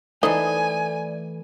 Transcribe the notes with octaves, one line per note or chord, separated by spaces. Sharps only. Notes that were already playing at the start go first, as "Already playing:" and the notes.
E3 A3 D#4 C5 D5 D#5 G#5